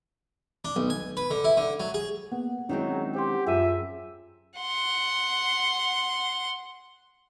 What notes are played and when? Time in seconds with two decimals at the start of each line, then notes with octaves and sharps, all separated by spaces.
0.65 D4
0.76 B1
0.90 G#5
1.17 B4
1.31 D3
1.44 E4
1.57 D3
1.80 F#3
1.94 G#4
2.32 A#3 B3 F#5
2.69 D#3 F#3 G#3 C4 C#4 E4
3.15 G4 C5 F#5 C6
3.47 F#2 F4 G#4 E5 D#7
4.59 F#5 C6